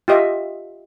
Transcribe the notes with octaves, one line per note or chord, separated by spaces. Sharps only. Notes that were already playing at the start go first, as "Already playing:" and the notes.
F4 G4 D#5 E5